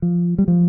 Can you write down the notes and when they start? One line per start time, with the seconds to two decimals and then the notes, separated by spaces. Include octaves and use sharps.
0.02 F3
0.38 G3
0.48 F3